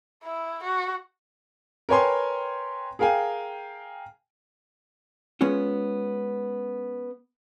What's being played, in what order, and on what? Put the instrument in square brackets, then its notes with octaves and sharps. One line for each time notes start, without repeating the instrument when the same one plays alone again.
[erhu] E4
F#4
[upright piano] A#4 B4 C#5 G5 G#5 C6
G#4 A#4 F5 G5 G#5
[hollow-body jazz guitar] G#3 B3 C#4 F4